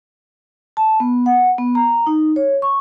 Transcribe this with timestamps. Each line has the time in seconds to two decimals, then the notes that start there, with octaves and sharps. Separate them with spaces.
0.77 A5
1.00 B3
1.26 F#5
1.58 B3
1.75 A#5
2.07 D#4
2.36 C#5
2.62 C#6